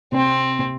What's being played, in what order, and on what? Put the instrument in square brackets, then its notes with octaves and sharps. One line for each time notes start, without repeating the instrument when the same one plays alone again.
[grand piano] C3 [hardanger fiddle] C4
[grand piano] C3